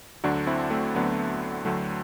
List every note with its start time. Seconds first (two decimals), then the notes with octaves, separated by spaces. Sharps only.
0.24 D2 D3 F#3 D4 F#4
0.47 C4 E4
0.71 A3 C4
0.95 D2 D3 F#3 B3
1.65 D2 D3 F#3 A3